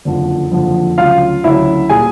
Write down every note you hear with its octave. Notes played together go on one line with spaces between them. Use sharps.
F#1 F2 D3 F3
F#1 F2 D3 F3
D2 C#3 F#3 F4 F5
D2 C#3 F#3 E4 E5
A#2 G3 G#4 G#5